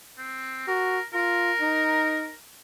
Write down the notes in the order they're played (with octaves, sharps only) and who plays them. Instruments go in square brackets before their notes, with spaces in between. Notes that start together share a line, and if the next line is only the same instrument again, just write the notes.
[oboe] C4
[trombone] F#4 [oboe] A#4
[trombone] F4 [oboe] A#4
[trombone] D#4